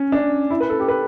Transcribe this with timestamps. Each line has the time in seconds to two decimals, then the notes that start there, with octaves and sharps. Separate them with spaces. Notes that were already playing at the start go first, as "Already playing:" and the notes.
Already playing: C#4
0.12 D4
0.50 E4
0.60 B4
0.70 A4
0.80 G4
0.88 B4